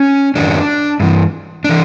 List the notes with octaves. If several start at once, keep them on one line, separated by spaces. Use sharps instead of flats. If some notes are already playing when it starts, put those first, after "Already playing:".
Already playing: C#4
F#2 D#3 F#3 D4
G2 E3
E3 D4